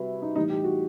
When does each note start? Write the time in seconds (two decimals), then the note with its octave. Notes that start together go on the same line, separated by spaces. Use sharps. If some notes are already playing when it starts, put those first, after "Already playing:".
Already playing: C3 G3 E4 F#4 B4
0.22 D#4
0.36 A2 E3 G3 D#4
0.50 G4
0.64 F#4